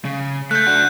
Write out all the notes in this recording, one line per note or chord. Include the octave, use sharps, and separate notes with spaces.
C#3
A3 F#6 G6
D4 F#4